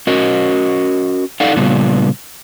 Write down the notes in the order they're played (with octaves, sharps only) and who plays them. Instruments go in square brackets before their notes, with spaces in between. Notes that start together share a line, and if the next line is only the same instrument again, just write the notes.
[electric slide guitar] C#4 F#4 A#4 D#5
D#4 A4 D5 F5 F#5
A#2 C#3 G3 B3 D4 F4